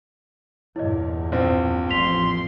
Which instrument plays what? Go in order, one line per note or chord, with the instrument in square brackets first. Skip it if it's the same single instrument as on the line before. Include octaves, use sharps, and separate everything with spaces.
[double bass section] E2 G2 A#2 [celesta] E4 C#5 D#5
[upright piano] A#1 C4
[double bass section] A1 F2 [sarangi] C6 [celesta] B6 F7